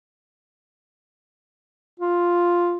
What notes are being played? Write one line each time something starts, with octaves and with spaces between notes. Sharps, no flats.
F4